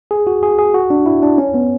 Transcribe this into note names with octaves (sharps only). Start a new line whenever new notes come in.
G#4
F#4
G#4
G#4
F#4
D4
E4
D4
C#4
B3